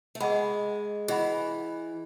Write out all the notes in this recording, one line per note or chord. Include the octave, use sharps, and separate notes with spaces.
A3
G#3 G#4 D#5 F#5 B5
E3 G#4 D#5 F#5 B5